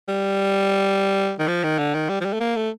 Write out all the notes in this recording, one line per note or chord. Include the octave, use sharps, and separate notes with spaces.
G3
D#3
F3
D#3
D3
D#3
G3
F3
G3
A3
A#3
A3